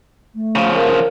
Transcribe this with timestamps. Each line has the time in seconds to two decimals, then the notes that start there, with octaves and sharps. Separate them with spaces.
0.35 A3
0.55 C#3 F3
0.74 A#4